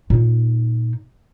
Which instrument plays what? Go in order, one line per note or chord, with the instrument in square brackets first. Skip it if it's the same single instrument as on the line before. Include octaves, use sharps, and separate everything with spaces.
[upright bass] A#2 D#4